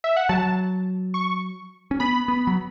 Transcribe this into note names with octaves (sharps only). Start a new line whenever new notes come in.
E5
F#5
F#3 A5
C#6
C#4
B3 B5
B3
F#3